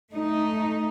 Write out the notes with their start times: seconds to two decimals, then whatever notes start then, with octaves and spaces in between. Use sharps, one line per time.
0.13 A3 D#4